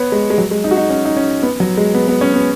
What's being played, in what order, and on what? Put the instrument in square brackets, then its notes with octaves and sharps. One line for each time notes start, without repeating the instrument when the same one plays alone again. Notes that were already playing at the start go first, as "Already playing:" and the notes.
Already playing: [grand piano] B3 B4 C#5
G#3
G#3
F#3
G#3
D#4
F#4
D#4
C#4
D#4
C#4
B3
F#3
G#3
B3
B3
C#4
B3